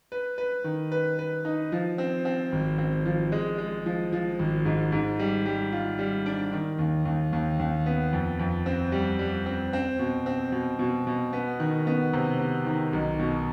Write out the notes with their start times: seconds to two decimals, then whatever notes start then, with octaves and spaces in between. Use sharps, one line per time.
0.12 B4
0.38 B4
0.64 D#3
0.92 B4
1.19 B4
1.45 D#4
1.72 F3
1.98 C4
2.25 C4
2.52 G#1
2.78 C4
3.05 F3
3.32 G#3
3.58 G#3
3.86 F3
4.13 F3
4.39 G#1
4.65 G#2
4.92 G#2
5.19 G3
5.46 G3
5.72 F4
5.99 G3
6.26 D4
6.53 D#3
6.79 D#2
7.05 D#2
7.33 D#2
7.59 D#2
7.86 B3
8.13 F2
8.39 F2
8.66 C4
8.92 G3
9.19 G3
9.46 C4
9.73 C4
9.99 B2
10.26 C4
10.52 B2
10.79 B2
11.07 B2
11.33 B3
11.60 D#3
11.87 B3
12.13 C3
12.40 B3
12.66 D#3
12.93 B1
13.19 B2